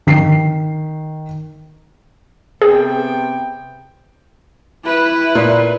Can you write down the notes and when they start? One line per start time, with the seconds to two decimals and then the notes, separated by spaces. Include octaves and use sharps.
0.07 D#3 C7
2.62 C3 B3 G#4 G5
4.84 E4 B4
5.35 A#2